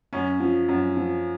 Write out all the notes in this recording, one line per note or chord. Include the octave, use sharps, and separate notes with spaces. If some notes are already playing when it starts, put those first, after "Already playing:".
F#2 C#4
F3
F#2
F3